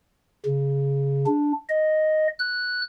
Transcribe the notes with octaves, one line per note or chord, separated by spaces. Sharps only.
C#3
D4
D#5
F#6